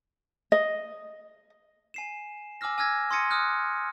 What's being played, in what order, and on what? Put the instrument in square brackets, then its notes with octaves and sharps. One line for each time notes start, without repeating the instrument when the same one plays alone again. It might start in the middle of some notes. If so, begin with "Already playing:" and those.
[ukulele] D#5
[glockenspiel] G#5 C7 E7
G#5 D6 E6 F6 A#6
G#5 E6 F6 G#6 A#6
C6 D#6 G#6 A#6 C#7 D#7
D#6 F6 F#6